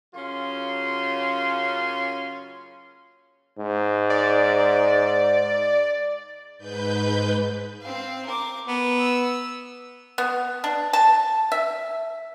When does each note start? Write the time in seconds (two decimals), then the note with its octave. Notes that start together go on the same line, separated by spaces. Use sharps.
0.15 C#3 F#3 A#3 C#4 F4 C6
3.58 G#2
4.10 D5
6.58 G#2 B4 G6
7.81 C4 F5
8.26 A#4 D6
8.68 B3 A#4
9.00 E6
10.18 B3
10.64 D4
10.93 A5
11.52 E5